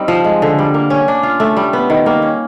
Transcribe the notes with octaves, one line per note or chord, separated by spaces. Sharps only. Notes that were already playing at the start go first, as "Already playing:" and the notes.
Already playing: G3 C4 D#4
F3
G#3
D3
G3
A#3
C#4
D4
F4
A3
G3
B3
D#3
A#3
C#4